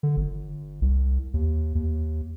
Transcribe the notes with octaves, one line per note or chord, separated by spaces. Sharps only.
D3
G1
C2
D#2
D#2